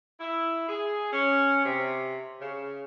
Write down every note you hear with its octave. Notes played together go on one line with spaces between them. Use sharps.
E4
G#4
C#4
C3
C#3